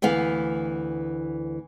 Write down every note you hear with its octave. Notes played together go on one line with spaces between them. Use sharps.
D2 E3 B3 F5